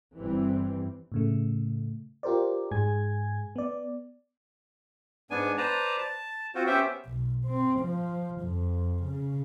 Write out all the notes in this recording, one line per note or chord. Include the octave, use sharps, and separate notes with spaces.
G1 E3 G3 C4
A2 C#3 A3
F4 G4 A#4 C5 D5
G#2 G#4 G#5 G#6
B3 D5
G#2 B3 D4 G#5
B4 C5 D5 A5 A#5
A5
C4 F4 F#4 C5
B3 C#4 G4 C5 E5 G5
B1
C4
F3
F2
C#3